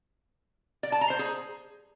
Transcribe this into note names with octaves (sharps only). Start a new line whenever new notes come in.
D5
A5
A#5
C5
G#4